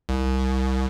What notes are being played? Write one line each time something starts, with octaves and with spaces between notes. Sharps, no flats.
C2